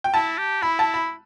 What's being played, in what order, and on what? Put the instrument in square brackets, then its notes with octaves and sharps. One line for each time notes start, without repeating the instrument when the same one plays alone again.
[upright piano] G5
[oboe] E4 [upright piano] A5
[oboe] G4
[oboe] E4 [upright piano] B5
[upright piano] A5
B5